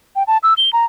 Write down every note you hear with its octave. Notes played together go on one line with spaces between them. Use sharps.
G5
A5
E6
G7
A#5